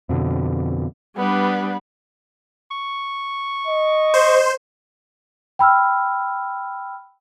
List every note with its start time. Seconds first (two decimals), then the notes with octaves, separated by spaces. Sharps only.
0.09 F2 B2 D3
1.17 G3 B3 D4 B4
2.71 C#6
3.67 D#5
4.14 C5
5.59 G5 B5 E6 F6